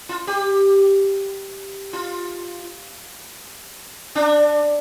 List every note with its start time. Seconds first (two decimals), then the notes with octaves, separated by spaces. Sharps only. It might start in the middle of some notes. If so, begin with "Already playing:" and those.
0.09 F4
0.27 G4
1.93 F4
4.15 D4